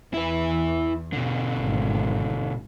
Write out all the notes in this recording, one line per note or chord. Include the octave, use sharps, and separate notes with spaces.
E2 E4 B4
B2 D3
G#1